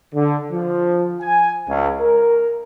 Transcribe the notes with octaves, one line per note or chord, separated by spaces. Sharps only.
D3
F3
G#5
C#2
A#4